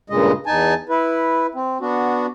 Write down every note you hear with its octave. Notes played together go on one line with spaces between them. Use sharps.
G2 A#2 C#3 G#3 D#5
E2 D#4 G#5 A5
E4 B4
C4
B3 D4 F#4